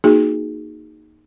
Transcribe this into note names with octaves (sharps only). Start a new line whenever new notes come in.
A#3 D#4 F#4 G#4